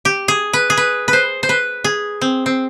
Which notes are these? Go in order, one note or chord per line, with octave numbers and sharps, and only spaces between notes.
G4
G#4
B4
G#4
B4
B4
C5
C5
B4
G#4
C4
C4